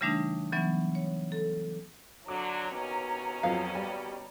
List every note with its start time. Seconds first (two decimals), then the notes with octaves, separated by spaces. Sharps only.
0.01 C#3 E3 G3 A3 D4 D#4
0.52 E3 F#3 B3 C#4
0.95 C#5
1.32 A4
2.28 D3 F#3 C#5 A#5 D6
2.71 D#2 B2 C#4
3.43 F2 F3 F#3 F5
3.75 G3